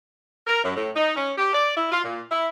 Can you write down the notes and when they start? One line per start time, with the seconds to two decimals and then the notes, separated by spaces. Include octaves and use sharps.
0.47 A#4
0.64 F#2
0.76 A2
0.96 D#4
1.16 C#4
1.38 G4
1.53 D5
1.77 E4
1.92 F4
2.05 A#2
2.31 E4